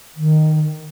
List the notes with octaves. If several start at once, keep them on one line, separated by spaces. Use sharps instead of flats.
D#3